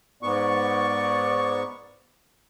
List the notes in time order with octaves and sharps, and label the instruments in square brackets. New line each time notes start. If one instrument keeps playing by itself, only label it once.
[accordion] G#2 B3 C#6 [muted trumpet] D5